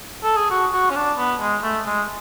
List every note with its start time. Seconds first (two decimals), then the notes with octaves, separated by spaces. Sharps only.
0.23 A4
0.37 G#4
0.50 F#4
0.72 F#4
0.90 C#4
0.96 D4
1.18 B3
1.40 G#3
1.63 A3
1.86 G#3